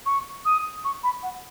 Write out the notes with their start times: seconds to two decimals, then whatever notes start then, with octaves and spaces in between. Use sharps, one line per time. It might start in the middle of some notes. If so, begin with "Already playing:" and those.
0.06 C#6
0.45 D#6
0.85 C#6
1.03 B5
1.23 F#5